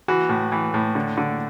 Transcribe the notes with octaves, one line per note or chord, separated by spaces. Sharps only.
E3 F#4
A2
E3
A2
D3
D3